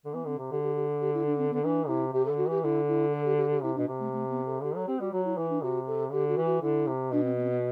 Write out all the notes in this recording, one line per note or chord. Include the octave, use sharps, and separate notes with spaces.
D3
E3 B3
D3 C4
C3
D3 G4
G4
G4
G4
E4
D4
C4
D3 B3
E3 D4
C3 E4
C3 G4
A4
D3
F#4
E3 G4
D3 E4
E4
A4
G4
G4
G4
C3 E4
B2 D4
C3
A3
A3
B3
A4
D3 G4
F#3 A4
C4 G4
G3 F#4
F#3 F#4
E4
E3 E4
D4
C3 F#4
A4
D3 G4
F#4
E3
F#4
D3 E4
C3
B2 D4
C4
B3
C4
B3